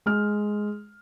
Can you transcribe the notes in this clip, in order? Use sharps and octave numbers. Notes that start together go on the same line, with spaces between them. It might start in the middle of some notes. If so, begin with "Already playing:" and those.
G#3 F6